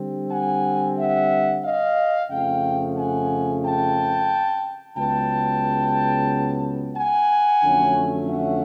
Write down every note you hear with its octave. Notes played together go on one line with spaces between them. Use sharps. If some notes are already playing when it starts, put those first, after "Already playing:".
Already playing: D3 G3 C4
F#5 G#5
E5 F#5
D#5 F5
F2 C#3 F3 A3 F5 G5
F#5 G#5
G5 A5
C#2 C#3 F#3 B3 G5 A5
F#5 G#5
F2 D3 F#3 A3 C#4
E5 F#5